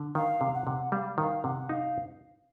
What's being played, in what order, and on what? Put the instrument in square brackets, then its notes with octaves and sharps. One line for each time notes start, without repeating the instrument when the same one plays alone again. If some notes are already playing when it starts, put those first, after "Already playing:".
Already playing: [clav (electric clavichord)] D3
[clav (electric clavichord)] D#3 [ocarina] F5
[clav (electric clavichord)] C3
[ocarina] F#5
[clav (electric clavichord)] C3
[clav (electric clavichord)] G3 [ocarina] F5
[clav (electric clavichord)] D#3 [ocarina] F5
[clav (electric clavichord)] C3 [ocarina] F#5
[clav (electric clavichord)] D#4 [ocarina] F5